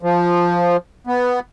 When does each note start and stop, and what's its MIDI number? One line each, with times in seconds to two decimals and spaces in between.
0.03 0.77 53
1.07 1.40 59